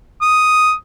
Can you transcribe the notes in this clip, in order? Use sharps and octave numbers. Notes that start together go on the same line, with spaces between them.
D#6